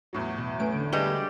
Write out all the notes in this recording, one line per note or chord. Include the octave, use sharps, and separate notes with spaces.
E2 A2 F#3
B2
A3 C#4 B4 D7
D3
G3 G#3 G4 B4 F5